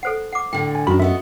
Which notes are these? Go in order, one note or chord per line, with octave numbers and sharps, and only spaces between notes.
A4 C5 F#5
F#5 D6
A2 D3 G5
G#5
F#2 D#3 D4 F#4 B5
A3 B3 F#4 D#5 E5